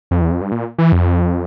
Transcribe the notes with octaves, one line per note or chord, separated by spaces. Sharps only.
F2
E2
F2
G2
A#2
E3
F2